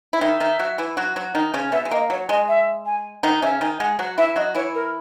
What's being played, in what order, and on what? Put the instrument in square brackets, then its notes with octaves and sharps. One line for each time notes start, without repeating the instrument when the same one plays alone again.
[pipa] E4
[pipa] D#3 D#4 [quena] E5
[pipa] D#3 D#4
F#3 F#4
E3 E4
F#3 F#4
F#3 F#4
D#3 D#4
C#3 C#4
[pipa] B2 B3 [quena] E5
[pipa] G#3
[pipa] A#3 [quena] D#5
[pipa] F#3 [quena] C#5
[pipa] G#3 [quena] D#5
[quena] E5
G#5
[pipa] D#3 D#4 [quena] F#5
[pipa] C#3 C#4 [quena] E5
[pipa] D#3 D#4 [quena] G#5
[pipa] G#3 G#4 [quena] F#5
[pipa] F#3 F#4 [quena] F#5
[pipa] E3 E4 [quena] E5
[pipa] F#3 F#4 [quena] D#5
[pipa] E3 E4 [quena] C#5
[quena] A#4